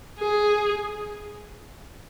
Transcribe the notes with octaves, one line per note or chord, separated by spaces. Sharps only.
G#4